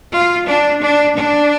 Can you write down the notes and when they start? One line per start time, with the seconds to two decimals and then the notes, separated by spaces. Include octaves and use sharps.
0.14 F4
0.48 D4
0.83 D4
1.17 D4